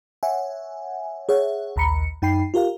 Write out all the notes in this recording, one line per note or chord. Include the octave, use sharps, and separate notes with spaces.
C#5 E5 F#5 G#5
G#4 C#5 E5 F#5
A#1 D#2 A#5 B5 C#7
F#2 D#4 G5 B5 C7
F4 G4 A#4 F5